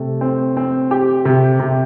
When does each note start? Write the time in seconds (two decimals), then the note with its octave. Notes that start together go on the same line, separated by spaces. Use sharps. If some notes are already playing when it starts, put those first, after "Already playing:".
Already playing: C3 A3
0.21 C4
0.57 C4
0.91 G4
1.25 C3
1.60 C3